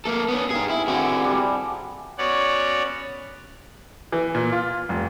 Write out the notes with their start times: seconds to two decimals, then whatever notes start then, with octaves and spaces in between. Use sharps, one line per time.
0.05 A#3 A4
0.28 B3 C#4
0.50 D#4 G#4 F5 G5
0.70 E4 G#4
0.88 D3 C4 E4 F#4
1.25 G3 G#3 D4
2.18 B3 C#4 F#4 C#5 D5 F#5
4.12 E3
4.35 A#2
4.52 F4
4.89 F1